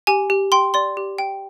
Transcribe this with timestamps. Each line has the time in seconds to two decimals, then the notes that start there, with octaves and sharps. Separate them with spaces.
0.07 G4 G#5
0.30 G4
0.52 G5 C6
0.74 D5 C6
0.97 G4
1.18 G5